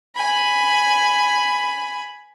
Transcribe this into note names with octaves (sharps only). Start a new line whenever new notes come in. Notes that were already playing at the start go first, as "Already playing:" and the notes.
G#5 B5